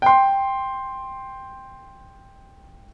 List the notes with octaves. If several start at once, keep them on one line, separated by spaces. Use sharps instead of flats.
G5 C6